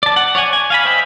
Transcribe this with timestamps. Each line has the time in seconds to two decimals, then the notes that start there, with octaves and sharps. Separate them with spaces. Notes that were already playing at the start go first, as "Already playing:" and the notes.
0.03 D5 A5
0.16 F#5
0.35 C#5 D5 F#5 G#5
0.53 G#5
0.70 F5 G#5 B5
0.85 C5 D#5 E5 G5 B5